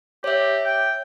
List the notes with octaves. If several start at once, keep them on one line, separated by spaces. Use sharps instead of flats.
G4 C#5 E5
G5